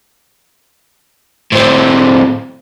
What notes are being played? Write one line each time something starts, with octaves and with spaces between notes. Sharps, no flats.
A2 C4